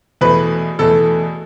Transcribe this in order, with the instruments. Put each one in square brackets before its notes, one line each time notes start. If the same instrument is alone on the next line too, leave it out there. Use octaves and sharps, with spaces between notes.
[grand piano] E2 B2 A3 B4
E2 B2 A3 A4